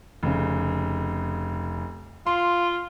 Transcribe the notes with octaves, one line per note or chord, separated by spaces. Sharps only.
F1 C#3
F4 C6